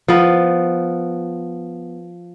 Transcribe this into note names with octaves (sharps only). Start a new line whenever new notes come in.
F3 B3